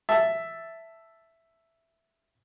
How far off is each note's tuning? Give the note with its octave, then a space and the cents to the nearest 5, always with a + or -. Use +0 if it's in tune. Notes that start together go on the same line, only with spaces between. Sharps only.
E5 +0 A5 +0